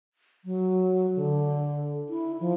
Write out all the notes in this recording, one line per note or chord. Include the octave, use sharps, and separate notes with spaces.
F#3
D3
E4
F3